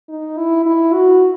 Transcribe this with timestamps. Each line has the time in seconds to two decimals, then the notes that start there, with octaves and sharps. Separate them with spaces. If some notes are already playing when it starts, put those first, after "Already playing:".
0.09 D#4
0.37 E4
0.65 E4
0.94 F#4